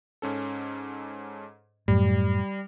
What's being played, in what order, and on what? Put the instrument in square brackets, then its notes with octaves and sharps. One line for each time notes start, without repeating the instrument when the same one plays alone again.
[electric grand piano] G#2 C#4 A4
[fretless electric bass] F#2 A2 [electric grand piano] G3